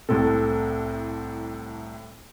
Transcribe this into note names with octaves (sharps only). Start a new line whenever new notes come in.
C2 A2 C3 A4